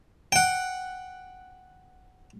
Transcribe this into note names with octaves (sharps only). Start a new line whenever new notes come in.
F#5 G5